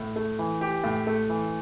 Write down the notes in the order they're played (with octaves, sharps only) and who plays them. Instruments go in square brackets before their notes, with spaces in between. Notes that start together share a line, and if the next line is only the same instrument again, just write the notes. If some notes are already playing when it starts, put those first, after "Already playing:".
Already playing: [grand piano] A2
A3
E3
G4
A2
A3
E3